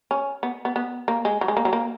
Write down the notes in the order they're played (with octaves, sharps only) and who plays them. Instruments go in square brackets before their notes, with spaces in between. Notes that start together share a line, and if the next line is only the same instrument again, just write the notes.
[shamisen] C#4
B3
B3
B3
A#3
G#3
F#3
G#3
A#3
F#3
A#3